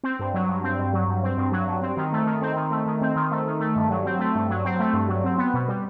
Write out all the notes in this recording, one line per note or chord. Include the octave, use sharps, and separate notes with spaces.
C4
G2
F#3
G2
C4
G2
F#3
G2
C4
G2
F#3
G2
C4
D#3
A3
D#3
C4
D#3
A3
D#3
C4
D#3
A3
D#3
A3
G2
F#3
C4
A3
G2
F#3
C4
A3
G2
F#3
C4
B3
B2
G3